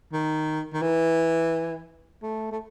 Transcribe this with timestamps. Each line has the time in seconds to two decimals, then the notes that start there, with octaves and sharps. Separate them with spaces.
0.13 D#3
0.73 D#3
0.82 E3
2.23 A3
2.52 A3